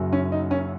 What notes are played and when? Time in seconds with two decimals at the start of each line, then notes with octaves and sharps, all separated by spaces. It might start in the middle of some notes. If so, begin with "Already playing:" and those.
Already playing: F#1 F#2 C#3 F#3
0.13 C#4
0.32 D#4
0.51 C#4